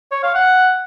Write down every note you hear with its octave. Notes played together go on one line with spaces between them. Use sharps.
C#5
F5
F#5